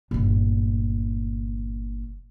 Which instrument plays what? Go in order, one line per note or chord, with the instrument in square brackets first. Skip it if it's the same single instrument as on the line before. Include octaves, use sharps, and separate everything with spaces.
[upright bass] G1 A#2